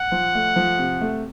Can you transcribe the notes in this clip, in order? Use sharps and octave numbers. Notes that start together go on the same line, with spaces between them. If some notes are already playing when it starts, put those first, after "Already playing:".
Already playing: F#5
F3
A3
F3
C3
A3